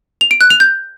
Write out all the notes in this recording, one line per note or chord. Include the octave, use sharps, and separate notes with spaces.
F7
D7
F#6
F7
G6